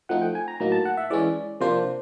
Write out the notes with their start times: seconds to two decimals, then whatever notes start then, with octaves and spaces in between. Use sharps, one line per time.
0.09 F3 A3 C4 D#4 F#5
0.22 G5
0.35 G#5
0.48 A#5
0.60 A2 F#3 A#3 D#4 A#5
0.72 A5
0.85 F#5
0.97 E5
1.10 E3 G#3 C#4 D5
1.61 C3 F3 A#3 D4 C5